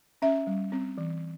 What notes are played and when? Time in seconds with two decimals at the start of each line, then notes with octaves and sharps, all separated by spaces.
0.22 C#4 E5
0.47 G3
0.72 C4
0.98 E3